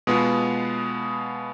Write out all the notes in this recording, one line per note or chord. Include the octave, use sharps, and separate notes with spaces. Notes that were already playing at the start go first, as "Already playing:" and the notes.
B2 G#3 B3 F4